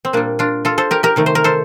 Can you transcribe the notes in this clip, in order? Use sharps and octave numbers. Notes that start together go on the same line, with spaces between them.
C4
A#2 G3 A#3 D4
D4 F4
F4 A4
A4 C5
G4 A#4
G4 A#4
C3 D#3 A3
C5
A#4
A4 C5